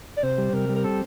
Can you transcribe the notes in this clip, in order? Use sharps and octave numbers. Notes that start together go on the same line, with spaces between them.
D5
C3 C5
G3
C3 A#4
G3
A#4
C4 A4